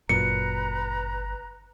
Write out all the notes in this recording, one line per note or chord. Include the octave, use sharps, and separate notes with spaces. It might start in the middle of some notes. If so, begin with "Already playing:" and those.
G1 F#2 A#2 B4 A#5 C#7